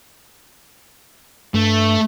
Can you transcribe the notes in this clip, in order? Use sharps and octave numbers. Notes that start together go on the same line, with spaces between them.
G2 A3